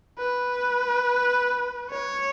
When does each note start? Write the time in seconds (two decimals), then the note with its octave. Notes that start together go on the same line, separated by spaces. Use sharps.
0.18 B4
1.90 C#5